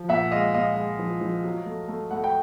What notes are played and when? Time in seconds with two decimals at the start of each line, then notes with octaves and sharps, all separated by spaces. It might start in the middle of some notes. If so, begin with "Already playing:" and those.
Already playing: F3
0.09 A#2 E5 F#5
0.31 G#3 D#5 F5
0.54 A#2 D#5 F5
0.76 G#3
0.99 F3
1.21 F3
1.44 F#3
1.66 A3
1.88 A3
2.11 A3 F#5
2.24 G5